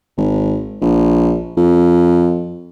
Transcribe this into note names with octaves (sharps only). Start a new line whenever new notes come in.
G#1
A#1
F2